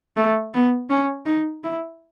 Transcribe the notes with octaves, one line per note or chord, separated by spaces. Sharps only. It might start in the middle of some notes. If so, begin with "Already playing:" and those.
A3
B3
C#4
D#4
E4